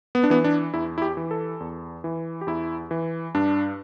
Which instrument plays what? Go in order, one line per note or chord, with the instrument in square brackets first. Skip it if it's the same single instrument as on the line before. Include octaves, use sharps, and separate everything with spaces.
[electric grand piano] B3
D4
E3 B3
D4
E2 E4
E4
G4
E3
A4
E2
E3
G4
E2 E4
E3
G2 D4